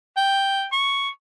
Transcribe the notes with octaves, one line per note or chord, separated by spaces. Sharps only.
G5
C#6